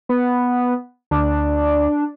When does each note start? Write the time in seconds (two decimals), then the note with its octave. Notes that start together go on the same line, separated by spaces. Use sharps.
0.09 B3
1.11 D2 D4